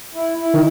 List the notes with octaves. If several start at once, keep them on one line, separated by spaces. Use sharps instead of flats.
E4
E4
D#3